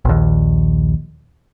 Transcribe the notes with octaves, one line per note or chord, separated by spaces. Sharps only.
A#1 D#2